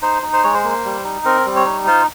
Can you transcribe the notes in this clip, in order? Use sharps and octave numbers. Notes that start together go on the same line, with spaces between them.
D#4 C5
D#4
C5
G#3 C#5
C5
A#3
G3
D#4
C4 A#4
G3
C#5
D#4
F4 C5